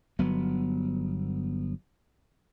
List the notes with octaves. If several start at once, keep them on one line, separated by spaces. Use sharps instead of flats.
G1 F#3 B3